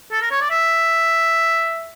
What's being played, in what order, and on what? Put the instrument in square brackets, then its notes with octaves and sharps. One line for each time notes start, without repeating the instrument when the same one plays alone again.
[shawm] A4
A#4
C#5
D5
E5